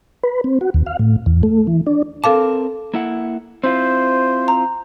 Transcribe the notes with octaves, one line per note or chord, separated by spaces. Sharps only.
B4
C4
F#4
D#2
F5
A2
E2
A3
E3
D4
C4 A4 A#4 F5 A5 D6
A#3 E4 F#5
C4 E4 F4 C5
A#5